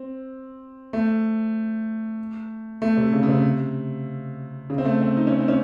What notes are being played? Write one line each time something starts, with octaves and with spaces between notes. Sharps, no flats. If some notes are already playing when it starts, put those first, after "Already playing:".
Already playing: C4
A3
A3
C3
C#3
C#3
C3
C#3
C4
A3
C4
D#4
C#4
C4
C#4